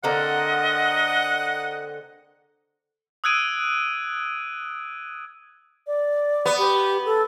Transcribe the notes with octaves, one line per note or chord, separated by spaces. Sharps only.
D3 A#3 C4 D#5 F#5
D#6 E6 F#6 G#6 D7 D#7
D5
B3
G4
A4